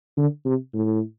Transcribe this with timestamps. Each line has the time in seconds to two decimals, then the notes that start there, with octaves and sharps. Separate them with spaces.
0.17 D3
0.45 C3
0.74 A2